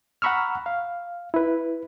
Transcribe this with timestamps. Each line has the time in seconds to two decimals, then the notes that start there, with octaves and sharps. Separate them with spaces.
0.22 F#5 A#5 B5 C#6 E6 F6
0.66 F5
1.34 E4 B4